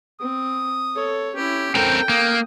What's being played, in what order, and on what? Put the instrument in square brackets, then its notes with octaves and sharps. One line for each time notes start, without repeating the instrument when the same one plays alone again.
[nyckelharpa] C4 [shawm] D#6
[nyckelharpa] A4 C#5
[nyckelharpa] C#4 E4 [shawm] G4
[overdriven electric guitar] C4 A#4 [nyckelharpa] A4 [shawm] G5
[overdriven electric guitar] A#3 [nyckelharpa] D#6